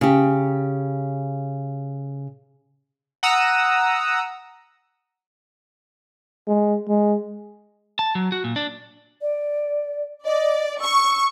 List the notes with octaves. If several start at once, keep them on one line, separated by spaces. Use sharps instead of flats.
C#3 G4
F#5 A#5 D#6 E6
G#3
G#3
A5
F#3
F#4
A#2
D4
D5
D5 D#5
C#6 E6